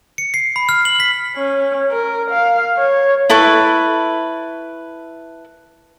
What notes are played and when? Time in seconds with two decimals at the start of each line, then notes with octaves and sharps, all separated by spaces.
0.18 C#7
0.34 C7
0.56 B5
0.69 F6
0.85 F#7
1.00 B6
1.36 C#4
1.91 A#4
2.31 F5
2.78 C#5
3.30 E4 A4 B4 C#6